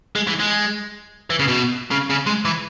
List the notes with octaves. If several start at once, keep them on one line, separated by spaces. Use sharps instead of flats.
G#3
E3
G#3
E3
C#3
B2
C#3
C#3
G#3
E3